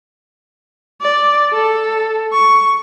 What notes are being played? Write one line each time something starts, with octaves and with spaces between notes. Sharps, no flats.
D5
A4
C#6